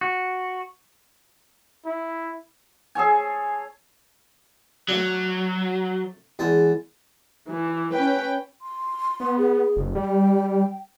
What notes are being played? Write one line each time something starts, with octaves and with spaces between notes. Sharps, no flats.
F#4
E4
G#4 A4 C#5 G#5
F#3 A3 D4
E2 G#3 A5
E3
C#4 B4 G5
C6
B3
G#4
F#1
G3 G5